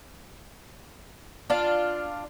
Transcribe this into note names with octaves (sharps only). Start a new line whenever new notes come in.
D4 F4